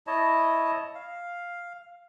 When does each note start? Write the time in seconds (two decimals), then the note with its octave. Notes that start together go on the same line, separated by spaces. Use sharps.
0.07 E4 C#5 D#5 A5
0.95 F5